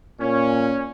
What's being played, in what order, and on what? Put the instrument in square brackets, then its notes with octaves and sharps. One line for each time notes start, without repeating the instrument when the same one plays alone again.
[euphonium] A#2 [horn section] C#4